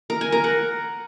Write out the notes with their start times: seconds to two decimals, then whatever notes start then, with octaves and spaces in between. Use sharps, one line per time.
0.10 A#4
0.21 G#5
0.32 A#4
0.44 F#5